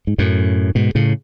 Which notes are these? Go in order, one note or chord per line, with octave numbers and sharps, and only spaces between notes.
G#2
F#2 A2
G#2 B2
A2 C#3